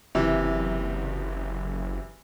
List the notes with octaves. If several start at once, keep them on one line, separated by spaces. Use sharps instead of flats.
F#1 C3 E3